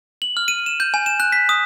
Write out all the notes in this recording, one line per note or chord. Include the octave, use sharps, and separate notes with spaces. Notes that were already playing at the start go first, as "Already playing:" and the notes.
F#7
F6
D#7
E7
G6
G#5
E7
F#6
B6
D#6